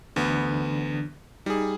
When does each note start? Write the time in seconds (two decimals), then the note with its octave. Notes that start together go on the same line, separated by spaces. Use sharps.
0.16 D2 D3 E3 B3 D4
1.46 G3 D#4 G#4